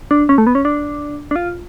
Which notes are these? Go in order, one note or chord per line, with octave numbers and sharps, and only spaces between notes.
D4
C#4
A3
B3
C#4
D4
D4
F4